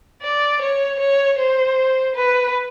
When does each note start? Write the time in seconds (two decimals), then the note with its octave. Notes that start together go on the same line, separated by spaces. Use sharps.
0.23 D5
0.61 C#5
0.99 C#5
1.38 C5
2.16 B4